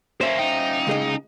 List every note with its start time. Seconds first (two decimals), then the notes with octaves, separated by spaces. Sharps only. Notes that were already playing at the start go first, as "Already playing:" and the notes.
0.21 A#3 C#4 C5 E5
0.39 C#4 D#4 F5 G5
0.87 C#2 G#4 D#5